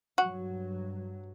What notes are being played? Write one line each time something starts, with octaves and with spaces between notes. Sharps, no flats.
G2 F#3 F#4